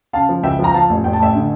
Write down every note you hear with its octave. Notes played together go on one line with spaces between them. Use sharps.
C#3 F5 A5
F3
C#2 E5 G5
F3
A#5
F3 F5 A5
A1
A1 G5
A5
A1 E5 G5
D3